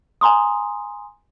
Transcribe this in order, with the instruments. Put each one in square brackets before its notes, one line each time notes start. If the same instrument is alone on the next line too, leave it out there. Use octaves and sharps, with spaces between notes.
[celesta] G#5 A#5 C6 D#6